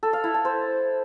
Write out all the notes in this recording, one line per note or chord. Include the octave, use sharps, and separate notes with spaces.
A4
F5
E4
A5
C5